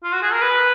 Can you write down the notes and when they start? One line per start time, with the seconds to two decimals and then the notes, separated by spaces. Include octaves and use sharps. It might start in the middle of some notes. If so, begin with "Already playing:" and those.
0.03 F4
0.13 F#4
0.23 G#4
0.33 A#4
0.42 B4